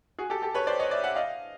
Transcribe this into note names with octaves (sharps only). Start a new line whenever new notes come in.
F#4 G#4
G4 A4
G4 A4
B4 C#5
C5 D5
C#5 D#5
D5 E5
E5 F#5
D#5 F5